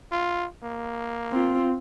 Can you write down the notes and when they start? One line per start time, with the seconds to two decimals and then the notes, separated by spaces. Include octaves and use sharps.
0.12 F4
0.63 A#3
1.32 C4 F4